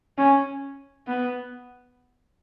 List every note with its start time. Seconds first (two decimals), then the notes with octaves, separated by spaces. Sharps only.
0.18 C#4
1.08 B3